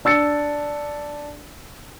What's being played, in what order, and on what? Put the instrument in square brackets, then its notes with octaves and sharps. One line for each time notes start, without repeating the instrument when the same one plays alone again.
[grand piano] D4 E6 A6 C#7